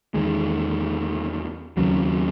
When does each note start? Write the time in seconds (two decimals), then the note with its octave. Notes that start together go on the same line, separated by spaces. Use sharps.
0.14 E2 D#3 G#3
1.77 D#2 C#3 F#3